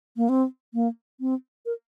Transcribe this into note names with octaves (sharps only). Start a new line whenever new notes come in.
A#3
C4
A#3
C4
A#4